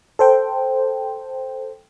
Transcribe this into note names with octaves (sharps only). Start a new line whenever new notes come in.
A4 C5 G5